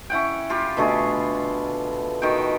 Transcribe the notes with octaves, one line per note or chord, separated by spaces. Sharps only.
C#4 E4 F#5 G5
F4 G4 B5
B2 D3 A3 G#4
B2 D#3 G5